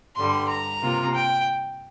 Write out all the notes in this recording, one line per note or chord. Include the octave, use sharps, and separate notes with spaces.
G2 D3 G3 C6
A#5
C3 A#3 F4
G5